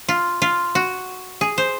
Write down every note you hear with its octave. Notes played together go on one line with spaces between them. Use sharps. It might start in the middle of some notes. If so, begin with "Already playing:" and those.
F4
F4
F#4
G#4
C5